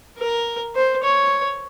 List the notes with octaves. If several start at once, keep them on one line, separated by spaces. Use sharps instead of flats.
A#4
C5
C#5